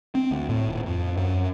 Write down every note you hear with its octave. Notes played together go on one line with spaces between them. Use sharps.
C4
D2
A2
D#1
F2
F#2